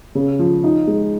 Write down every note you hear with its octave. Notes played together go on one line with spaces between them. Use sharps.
C#3
F3
D#4
G#3